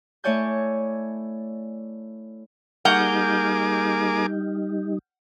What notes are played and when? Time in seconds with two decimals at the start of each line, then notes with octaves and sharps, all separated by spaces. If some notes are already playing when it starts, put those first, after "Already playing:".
0.24 A3 E4 C#5 D5 G#5 G6
2.85 G3 A#3 D#4 G#4 F#5 D6 F6 G6